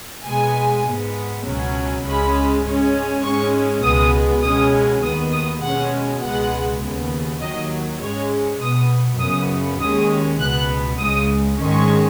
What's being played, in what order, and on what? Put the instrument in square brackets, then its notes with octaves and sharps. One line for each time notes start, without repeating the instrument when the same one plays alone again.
[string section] B2 G#3 B3 G#5
G#2 G#3 B3
C#2 B2 F#3 C#4
C#2 C#3 G#3 C#4 B5
G#2 G#3 C#4
G#2 G#3 C#4 C#6
C#2 B2 G#3 B3 D#6
B2 G#3 C#4 D#6
D#2 D#3 B3 D#6
D#6
B2 G#3 C#4 F#5
C#2 B2 G#3 B3 F#5
D#2 C#3 B3
D#2 D#3 F#3 D#5
G#2 G#3 C#4 C#5
B2 B3 D#6
F#2 C#3 B3 D#6
D#2 D#3 G#3 C#4 D#6
C#2 B2 B3 F#6
C#2 C#3 G#3 D#6
G#2 D#3 G#3 C#4 C#6